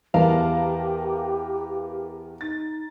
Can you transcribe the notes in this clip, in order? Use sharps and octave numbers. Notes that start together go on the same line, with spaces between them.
E2 B3 G4 A#4 F5 A5
D#4 A6